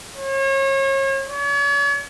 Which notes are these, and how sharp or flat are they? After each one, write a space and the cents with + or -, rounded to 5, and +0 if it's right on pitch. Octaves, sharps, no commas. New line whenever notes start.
C#5 -35
C#5 +40